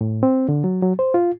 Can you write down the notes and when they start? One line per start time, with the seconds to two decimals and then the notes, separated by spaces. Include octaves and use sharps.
0.01 A2
0.23 C4
0.49 D3
0.64 F#3
0.82 F#3
0.99 C5
1.14 F4